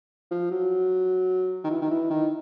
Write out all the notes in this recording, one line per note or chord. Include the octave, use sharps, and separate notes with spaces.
F3
F#3
D#3
E3
D#3
E3
D#3